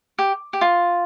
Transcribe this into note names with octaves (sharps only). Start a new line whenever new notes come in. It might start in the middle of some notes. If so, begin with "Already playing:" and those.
G4
G4
F4